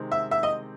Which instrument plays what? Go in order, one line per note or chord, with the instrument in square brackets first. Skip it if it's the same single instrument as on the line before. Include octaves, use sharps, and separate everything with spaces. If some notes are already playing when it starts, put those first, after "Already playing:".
Already playing: [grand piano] C3 D#3 G#3 C4
[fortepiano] E5
E5
D#5